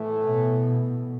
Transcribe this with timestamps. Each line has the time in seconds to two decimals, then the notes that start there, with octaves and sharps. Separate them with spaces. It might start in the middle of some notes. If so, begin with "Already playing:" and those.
Already playing: A2 E3 A3
0.26 B2